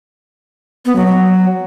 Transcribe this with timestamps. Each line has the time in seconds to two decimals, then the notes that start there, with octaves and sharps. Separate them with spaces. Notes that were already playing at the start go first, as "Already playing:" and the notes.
0.85 B3
0.96 F#3
1.06 F#3